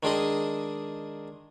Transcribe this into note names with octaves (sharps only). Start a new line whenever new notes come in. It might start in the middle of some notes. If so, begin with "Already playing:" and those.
D#3 G#3 D4 G#4 D#5